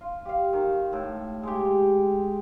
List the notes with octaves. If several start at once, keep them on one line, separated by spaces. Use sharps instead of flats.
F4
G4 F5
D#3
A2
G#3 G4